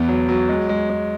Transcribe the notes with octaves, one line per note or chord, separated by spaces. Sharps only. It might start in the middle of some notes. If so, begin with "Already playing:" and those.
Already playing: E2 B3
F#3
F#3
G#3
G#3
G#3